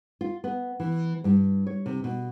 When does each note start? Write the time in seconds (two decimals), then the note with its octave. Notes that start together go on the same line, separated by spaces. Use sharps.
0.21 F4
0.44 B3
0.80 E3
1.24 G2
1.67 C#5
1.86 C3
2.04 B2